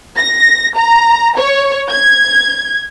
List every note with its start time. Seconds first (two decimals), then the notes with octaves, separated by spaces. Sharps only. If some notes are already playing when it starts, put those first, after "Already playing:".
0.18 A#6
0.77 A#5
1.38 C#5
1.90 G#6